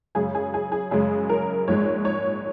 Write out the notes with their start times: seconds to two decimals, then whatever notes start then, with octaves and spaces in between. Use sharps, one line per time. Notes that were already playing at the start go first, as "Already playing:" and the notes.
0.15 F#2 C#3 G#3 G#4
0.35 G#4
0.54 G#4
0.72 G#4
0.91 F#2 C#3 G#3 G#4
1.29 A#4
1.68 A#1 G#2 G#3 C#5
2.05 C#5